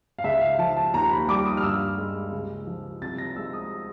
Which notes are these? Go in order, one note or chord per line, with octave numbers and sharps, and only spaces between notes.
F5
C#2 E5
F5
F3 A5
A5
D#2 A#5
B5
G3 D6
D#6
F6
G2 E6
G#3
C#2
F3
C2 A6
A#6
G#3 E6
D#6